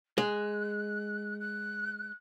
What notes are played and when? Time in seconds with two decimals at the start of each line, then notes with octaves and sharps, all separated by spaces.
0.18 G#3 F#6
1.40 F#6